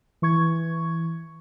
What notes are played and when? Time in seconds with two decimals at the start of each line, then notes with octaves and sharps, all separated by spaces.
0.22 E3 C#6 G#6